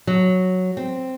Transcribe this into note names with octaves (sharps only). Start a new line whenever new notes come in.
F#3
C4